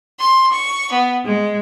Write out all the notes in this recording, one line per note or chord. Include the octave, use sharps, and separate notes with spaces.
C6
C#6
B3
G#3